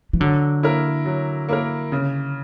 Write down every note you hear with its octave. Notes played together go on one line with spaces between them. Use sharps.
E3
D3 F#3
A#3 E4 A#4
F#3
A#3 E4 A#4
C#3